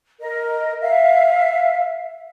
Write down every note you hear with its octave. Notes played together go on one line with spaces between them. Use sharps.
A#4 D#5
E5 F5